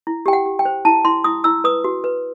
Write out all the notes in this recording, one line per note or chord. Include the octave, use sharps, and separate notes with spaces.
E4
G4 G5
F#5
G4
G5
C5
E4 A5
E4 C6
E4 D#6
E4 E6
B4 D#6
F#4
B4